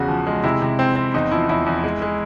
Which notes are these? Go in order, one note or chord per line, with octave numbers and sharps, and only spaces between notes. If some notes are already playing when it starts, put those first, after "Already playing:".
Already playing: E2 C#3 F#4
F3
G#3
C3 E4
C3
C4
C4
E2 D#4
F3 E4
E2 E4
E2
G#3
G#3